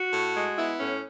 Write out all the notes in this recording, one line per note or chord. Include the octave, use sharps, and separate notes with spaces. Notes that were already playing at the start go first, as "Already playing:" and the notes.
Already playing: F#4
A2
G#3
B3 E4
A2 C#4